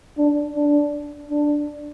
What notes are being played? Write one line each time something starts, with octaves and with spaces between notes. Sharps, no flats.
D4
D4
D4